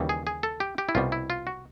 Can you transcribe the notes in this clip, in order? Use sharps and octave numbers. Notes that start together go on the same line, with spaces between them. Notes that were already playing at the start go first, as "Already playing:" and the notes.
Already playing: D#2 C#3 E3 G3
G#4
G#4
A4
G4
G4
E4
C2 B2 G3 F4
E4
F4
F#4